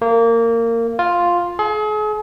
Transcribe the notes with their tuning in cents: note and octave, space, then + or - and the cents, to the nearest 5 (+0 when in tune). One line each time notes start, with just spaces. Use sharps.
A#3 -20
F4 +5
G#4 +40